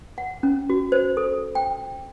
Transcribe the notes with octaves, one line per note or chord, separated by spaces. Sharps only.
F#5
C#4
F#4
C5
A4
G5